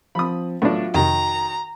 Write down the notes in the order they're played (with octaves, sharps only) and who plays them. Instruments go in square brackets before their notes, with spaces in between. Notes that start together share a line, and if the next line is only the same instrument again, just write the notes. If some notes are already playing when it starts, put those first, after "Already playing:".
[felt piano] F3 C4 [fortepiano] B5 D#6
[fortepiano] A2 D4 [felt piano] F#3 F4 E5 [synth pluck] B3
[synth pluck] F2 C3 [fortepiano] D#3 [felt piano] F#4 [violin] A#5